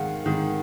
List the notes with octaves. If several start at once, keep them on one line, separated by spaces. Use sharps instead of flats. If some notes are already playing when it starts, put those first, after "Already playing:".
Already playing: G#2 D#3 G#3 F5 F#5
G#2 D#3 G#3